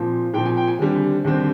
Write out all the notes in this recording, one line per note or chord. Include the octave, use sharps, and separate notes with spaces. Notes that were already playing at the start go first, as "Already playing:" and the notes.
Already playing: A#2 F3 C4
A#2 F3 C4 G5
G#5
G5
G#5
D#2 D3 G3 C4
D#2 D3 G3 C4